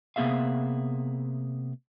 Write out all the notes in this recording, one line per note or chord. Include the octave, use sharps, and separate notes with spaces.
C3 A#3 B3 G#4 E5 F5